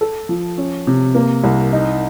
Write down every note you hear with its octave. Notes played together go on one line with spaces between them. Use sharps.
A4
F3
C#4
C3
A#3
C2
D#4